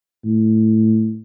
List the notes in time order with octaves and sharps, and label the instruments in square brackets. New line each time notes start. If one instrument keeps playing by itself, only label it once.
[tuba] A2